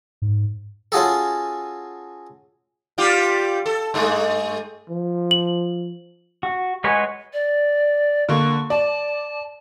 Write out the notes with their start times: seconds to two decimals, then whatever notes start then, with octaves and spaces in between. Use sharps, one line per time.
0.22 G#2
0.92 C#4 F4 F#4 G#4 A4
2.98 G3 F4 G4
3.66 A4
3.94 G2 G#3 A3
4.90 F3
5.31 F#7
6.43 F#4
6.84 G#3 F#4 B4 C#5 G#5
7.33 D5
8.29 D3 A#3 C#6
8.70 D5 A5